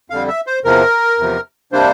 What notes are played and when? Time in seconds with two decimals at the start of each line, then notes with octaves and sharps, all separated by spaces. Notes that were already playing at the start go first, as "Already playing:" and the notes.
0.10 F2 D3 G3 F5
0.28 E5
0.47 C5
0.64 E2 C3 F3 A#4
1.18 E2 C3 F3
1.72 C3 G3 A#3 D4 C5